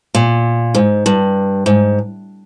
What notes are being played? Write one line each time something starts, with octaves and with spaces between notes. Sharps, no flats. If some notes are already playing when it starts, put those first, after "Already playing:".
A#2
G#2
G2
G#2